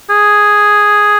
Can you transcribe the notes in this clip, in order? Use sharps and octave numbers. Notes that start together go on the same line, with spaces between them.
G#4